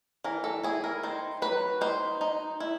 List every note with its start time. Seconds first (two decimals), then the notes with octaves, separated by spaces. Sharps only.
0.24 E3 A#4
0.44 A4
0.64 E4 G#4
0.84 A#4
1.03 D#3 C5
1.42 F#3 B4
1.81 D#4 C5
2.21 D#4
2.60 E4